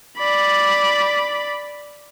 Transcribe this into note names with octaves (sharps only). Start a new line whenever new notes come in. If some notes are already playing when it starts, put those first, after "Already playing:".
D5 B5